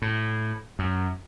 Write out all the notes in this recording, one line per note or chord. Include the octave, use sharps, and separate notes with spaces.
A2
F#2